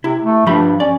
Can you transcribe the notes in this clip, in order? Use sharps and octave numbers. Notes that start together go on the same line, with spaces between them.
C3 E4
A3
G2 F3 G4 B5
C#4 D5